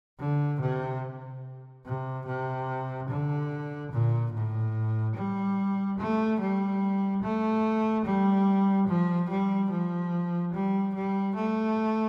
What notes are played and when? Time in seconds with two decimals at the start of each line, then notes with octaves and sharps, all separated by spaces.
0.19 D3
0.60 C3
1.85 C3
2.26 C3
3.09 D3
3.91 A#2
4.33 A2
5.15 G3
5.98 A3
6.40 G3
7.23 A3
8.05 G3
8.87 F3
9.29 G3
9.70 F3
10.53 G3
10.95 G3
11.35 A3